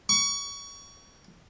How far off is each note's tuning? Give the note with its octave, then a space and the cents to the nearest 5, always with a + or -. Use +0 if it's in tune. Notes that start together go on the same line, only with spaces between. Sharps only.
C#6 +25